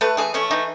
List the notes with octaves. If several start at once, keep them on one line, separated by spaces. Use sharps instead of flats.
A3 B4
E3 G#4
A3 C#4
E3 D#4